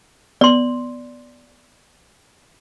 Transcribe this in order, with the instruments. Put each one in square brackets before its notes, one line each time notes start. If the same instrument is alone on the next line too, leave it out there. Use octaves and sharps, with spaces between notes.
[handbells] B3 [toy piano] D5 C6